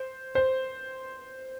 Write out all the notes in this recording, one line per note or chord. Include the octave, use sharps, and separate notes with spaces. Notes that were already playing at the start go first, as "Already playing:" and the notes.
Already playing: C5
C5